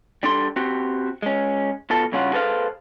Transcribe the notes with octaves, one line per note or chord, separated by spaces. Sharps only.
G3 D4 A4 C6
C4 F#4 G4
G#3 C#4
B2 F4 A4 A5
G2 C#3 C#4 F4 F#4
G#4 A4 B4 C5 F5